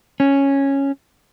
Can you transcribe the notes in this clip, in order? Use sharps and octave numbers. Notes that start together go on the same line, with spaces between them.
C#4